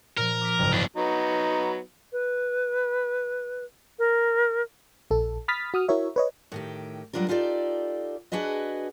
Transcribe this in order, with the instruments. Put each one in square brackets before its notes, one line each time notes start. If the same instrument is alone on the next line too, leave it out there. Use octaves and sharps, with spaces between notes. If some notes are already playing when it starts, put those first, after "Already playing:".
[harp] A#2 F3 [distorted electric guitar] A#4
[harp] D6 B6
F#1 C2 G#2
[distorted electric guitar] D#2 D4 [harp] C#4 E4 C#6
[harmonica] F#3 B3 D#4
[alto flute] B4
A#4
[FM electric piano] A#1 A4
B5 D#6 F6 A6 B6
F#4 D#6 F6
E4 F#4 A#4 C#5 E5
B4 C#5 D#5
[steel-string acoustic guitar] A2 D#3 G4
F#3 G3 D4 F4 A#4
D#4 F4 G4 A4 C5 D5
D4 F#4 G#4 B4 D#5